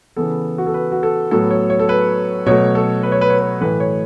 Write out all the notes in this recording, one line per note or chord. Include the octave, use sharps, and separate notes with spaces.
C#3 E3 B3 A4
F#4
A4
B4
F#4
A4
A2 F#3 B3 A4
C#5
C#5
A4
B4
B2 F#3 A3 C#5
A4
B4
C#5
B4
C#5
B4
A2 E3 A3 B4
C#5